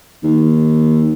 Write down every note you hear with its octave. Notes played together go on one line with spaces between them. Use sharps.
D#2